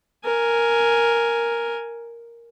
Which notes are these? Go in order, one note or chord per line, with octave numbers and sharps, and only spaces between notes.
A#4 G#5